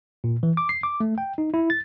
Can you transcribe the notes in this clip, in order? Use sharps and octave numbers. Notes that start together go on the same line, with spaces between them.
A#2
E3
D6
C7
D6
A3
G5
D#4
E4
A6